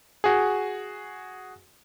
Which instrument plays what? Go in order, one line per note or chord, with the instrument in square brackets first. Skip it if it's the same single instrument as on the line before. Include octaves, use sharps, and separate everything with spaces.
[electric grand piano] F#4 G#4